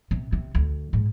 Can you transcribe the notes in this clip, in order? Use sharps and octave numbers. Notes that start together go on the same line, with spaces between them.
C3
C3
D2
G#2